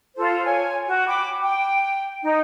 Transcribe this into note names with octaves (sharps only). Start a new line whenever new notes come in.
F4 A4 C5
C#5 G#5
F#4
G5 B5 D6
G5
D#4